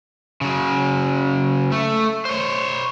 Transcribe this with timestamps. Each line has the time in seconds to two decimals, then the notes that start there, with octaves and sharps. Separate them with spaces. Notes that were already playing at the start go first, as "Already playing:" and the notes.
0.41 C#3 F#3
1.72 A3
2.25 C5 C#5